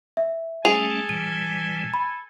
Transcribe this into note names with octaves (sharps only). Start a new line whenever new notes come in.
E5
G3 A3 C#4 G#4 A4 G#5 F7
A#2 E3 G3 D#7
B5